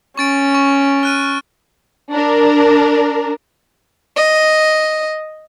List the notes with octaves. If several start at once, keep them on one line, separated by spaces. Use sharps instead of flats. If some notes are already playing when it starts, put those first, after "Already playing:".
C#4 C#6 A6 D7
C#6
F6 F#6 D#7
D4 A#4
D#5